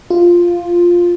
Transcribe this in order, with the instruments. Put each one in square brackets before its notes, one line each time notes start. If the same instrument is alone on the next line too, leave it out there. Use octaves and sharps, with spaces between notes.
[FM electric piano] F4